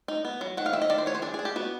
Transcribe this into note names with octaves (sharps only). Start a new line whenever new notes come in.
D#4
B3
F#3
D#3 F#5
F5
D#3 E5
D#5
D#3 D5
C5
B3 C#5
C5
D4 G#4
G#4
D4
G4
B3 F#4